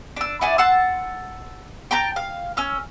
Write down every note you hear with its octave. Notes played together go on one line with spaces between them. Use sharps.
D4 E6
E4 F#4 G#4 D5
F#5 A5 C6 E6
G5 A5 A#5 G6
F5
C#4 E6 F6